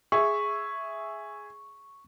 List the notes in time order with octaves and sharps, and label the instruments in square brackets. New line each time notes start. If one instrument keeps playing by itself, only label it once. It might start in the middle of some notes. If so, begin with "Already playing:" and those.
[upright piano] G#4 E5 [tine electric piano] C#6